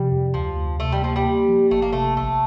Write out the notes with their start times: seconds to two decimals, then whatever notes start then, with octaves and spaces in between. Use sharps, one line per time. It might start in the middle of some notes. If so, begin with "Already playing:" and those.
Already playing: C3 F3 G3
0.12 F2
0.34 D2 F3
0.56 D2
0.79 C3 A3
0.92 G3
1.02 F3 A#3
1.16 G3
1.25 A#3
1.48 F3
1.71 G1 A3
1.82 A#3
1.93 C3 A3
2.17 A#1 A3